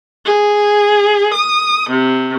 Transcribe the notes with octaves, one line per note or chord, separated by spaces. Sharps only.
G#4
D#6
C3